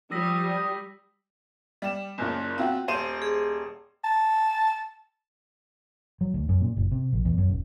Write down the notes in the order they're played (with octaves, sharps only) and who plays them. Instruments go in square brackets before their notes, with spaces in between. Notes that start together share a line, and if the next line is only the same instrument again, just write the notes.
[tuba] F3 [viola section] G3 [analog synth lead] D#6 [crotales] E6 A#6 B6
[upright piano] G3 E7
F#1 A#2 C#3
C4 F4 F#4
D#1 C5 D#7
[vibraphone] G#4
[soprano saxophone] A5
[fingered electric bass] F#3
D2
F#2
A#2
F#1
C3
A#1
E2
F#2
D#1